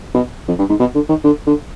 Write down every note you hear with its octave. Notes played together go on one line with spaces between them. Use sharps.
B2
F2
G2
G#2
B2
D3
D#3
D3
D3